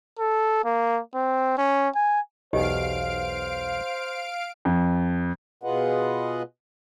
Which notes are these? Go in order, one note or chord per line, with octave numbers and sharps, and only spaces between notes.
A4
A#3
C4
C#4
G#5
B1 E2 D#4 G4 C5 D#5 F5 D7
F2
B2 F4 G#4 B4 D#5 F#5